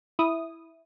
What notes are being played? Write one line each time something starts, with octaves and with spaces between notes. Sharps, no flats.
E4 D#6